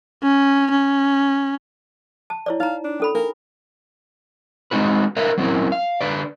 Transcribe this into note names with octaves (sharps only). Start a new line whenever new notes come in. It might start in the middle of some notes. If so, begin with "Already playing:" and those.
C#4
C#4
A5
E4 C#5 D5
D#4 F5 A#5
D4
C#4 A4 B5
D4 A#4
G#3 C4 D#4 F#4 B4
A#4 B4 D5 E5 F5
F#3 C4 C#4 E4 A#4
F5
D3 B4 D5